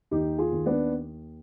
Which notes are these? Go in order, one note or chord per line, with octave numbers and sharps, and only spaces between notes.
D#2 D#4 G4
F4 G#4
D#2
B3 D4